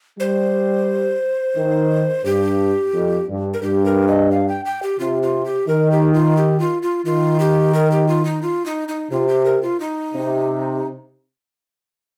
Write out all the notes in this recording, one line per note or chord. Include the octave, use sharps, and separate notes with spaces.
G3 C5
D#3
G2 G4
F2
G2
A#4
G2 G4
A#4
D#5
F5
G5
G5
G4
C3 F4
F4
G4
D#3 A#4
G4
F4
G4
F4
F4
D#3 F4
G4
A#4
G4
F4
D#4
F4
D#4
D#4
C3 F4
G4
A#4
F4
D#4
C3